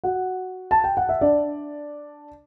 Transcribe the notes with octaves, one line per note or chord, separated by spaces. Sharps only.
F#4 F#5
A5
G5
F#5
E5
D4 D5